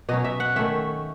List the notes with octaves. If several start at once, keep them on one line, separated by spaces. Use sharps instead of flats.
B2 F#3 C#4 D#5
E5
F#5
D#3 A3 C#4 E5